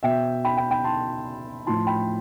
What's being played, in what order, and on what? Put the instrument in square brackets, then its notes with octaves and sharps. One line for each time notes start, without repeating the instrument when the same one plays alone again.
[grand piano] B2 E5 G5
G5 B5
G5 B5
G5 B5
A5 C6
A2 F3 A5 C6
G5 B5